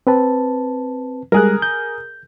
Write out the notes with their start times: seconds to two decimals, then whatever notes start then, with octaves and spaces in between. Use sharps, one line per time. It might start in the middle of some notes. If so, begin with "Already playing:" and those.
0.07 C4 B4 A5
1.32 G3 G#3 G#4 A#4 F#6
1.62 G6